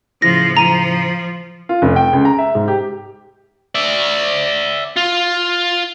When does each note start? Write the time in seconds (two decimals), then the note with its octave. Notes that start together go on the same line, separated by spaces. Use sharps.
0.22 A2 C#3 F3 E4 A#6
0.57 F3 A#5 D#7
1.69 F4
1.82 F1
1.96 G5
2.13 C#2
2.25 A#5
2.38 E5
2.55 G#2
2.68 G4
3.75 D5 E5
4.97 F4